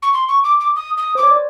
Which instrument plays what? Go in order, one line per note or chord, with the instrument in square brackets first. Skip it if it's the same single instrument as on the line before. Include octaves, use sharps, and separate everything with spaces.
[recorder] C#6
C6
C#6
D6
D6
D#6
D#6
[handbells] C5 [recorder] D6
[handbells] C#5
D5